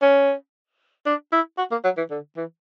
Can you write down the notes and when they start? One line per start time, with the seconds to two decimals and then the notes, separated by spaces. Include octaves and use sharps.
0.02 C#4
1.06 D4
1.32 E4
1.58 F#4
1.71 A#3
1.84 F#3
1.97 E3
2.11 D3
2.37 E3